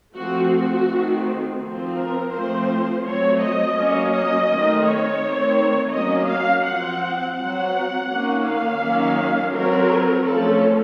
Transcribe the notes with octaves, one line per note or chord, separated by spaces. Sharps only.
F3 A3 C4 F#4
F#4
D#3 A3 C4
F3 C4
A#4
F3 A3 C4 C5
F#3 A3 C4 C#5
D#5
F#3 A#3 C#4
D#5
D#3 A3 C4
C#5
D#3 A3 C4
F#3 A#3 C#4 D#5
F5
F3 C4 F#5
F#3 C4 F#5
D#3 A#3 C#4
F5
D#3 F#3 A#3 C#4
F#3 C4 A#4
F3 A3 C#4 A4